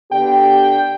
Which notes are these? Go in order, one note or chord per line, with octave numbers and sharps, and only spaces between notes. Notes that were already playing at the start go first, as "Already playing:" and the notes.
D3 B3 G4 G5